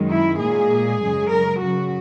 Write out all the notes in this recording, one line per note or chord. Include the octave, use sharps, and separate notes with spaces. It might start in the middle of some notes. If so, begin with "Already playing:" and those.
Already playing: F#2 D#3 G#3
E4
A#2 G#3 G#4
F#2 C#3 G#3
A#4
F#2 C#3 F#3 F#4